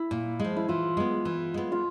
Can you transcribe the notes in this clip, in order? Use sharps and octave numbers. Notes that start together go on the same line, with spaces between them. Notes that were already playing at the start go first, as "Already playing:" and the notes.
Already playing: E4
A#2
F3 G#3
E4
E3 F4
G#3 B3
E3
G#3 B3
F4